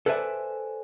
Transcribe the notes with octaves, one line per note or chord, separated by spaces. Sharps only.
A4 B4 C5 D5 E5 G#5